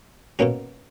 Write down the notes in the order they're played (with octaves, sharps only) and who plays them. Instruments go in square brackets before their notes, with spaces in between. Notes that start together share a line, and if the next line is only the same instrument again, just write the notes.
[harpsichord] B2 A#3 C#4 F#4